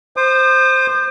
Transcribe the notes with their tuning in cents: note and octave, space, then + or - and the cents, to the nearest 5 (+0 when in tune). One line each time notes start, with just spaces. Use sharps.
C5 +0 D#6 -45